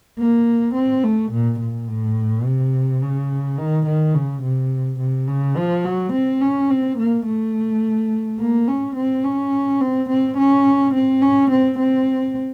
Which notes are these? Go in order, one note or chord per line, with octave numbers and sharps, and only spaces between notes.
A#3
C4
A3
A#2
A#2
A2
C3
C#3
D#3
D#3
C#3
C3
C3
C#3
F3
F#3
C4
C#4
C4
A#3
A3
A#3
C#4
C4
C#4
C4
C4
C#4
C4
C#4
C4
C4